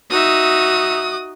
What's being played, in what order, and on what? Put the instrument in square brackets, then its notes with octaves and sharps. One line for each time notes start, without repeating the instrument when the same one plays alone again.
[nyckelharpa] D#4 E5 [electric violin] F#4 D#6